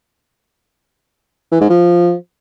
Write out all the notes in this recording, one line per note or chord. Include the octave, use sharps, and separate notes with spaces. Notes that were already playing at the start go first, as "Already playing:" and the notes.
E3
G#2
F3